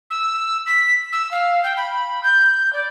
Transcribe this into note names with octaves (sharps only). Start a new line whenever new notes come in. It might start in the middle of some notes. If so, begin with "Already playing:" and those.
E6
B6
E6
F5
G5
B5
G6
D5